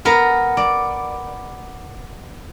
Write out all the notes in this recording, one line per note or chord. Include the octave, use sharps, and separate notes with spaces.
B3 A#4
D5